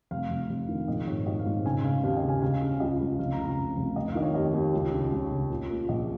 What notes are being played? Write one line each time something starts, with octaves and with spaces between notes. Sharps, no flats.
F1 F5
F1
F1
D#3
A#1 D#5
G#2 C#5
G#2 D#5
F5
G#2
C#3 G#5
C#3 F5
D#2 F5
D#5
C#3
G#5
C#3 F5
C#3
F5
C#2 D#5
C#2
F1 F5
A#5
C#3
A#5
F1
F1
F1 D#5
F5
D#3 D#5
C#5
D#2 D#5
D#2
C#2
C#3
C#2 C#5
C#3
A#2
A#2
A#1 D#5